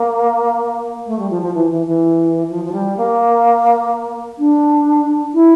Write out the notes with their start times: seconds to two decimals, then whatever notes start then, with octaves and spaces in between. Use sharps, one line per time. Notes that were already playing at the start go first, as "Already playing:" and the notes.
Already playing: A#3
1.06 A3
1.19 G3
1.30 F3
1.42 F3
1.54 E3
1.71 E3
1.87 E3
2.50 F3
2.64 F3
2.72 G3
2.97 A#3
4.38 D4
5.34 E4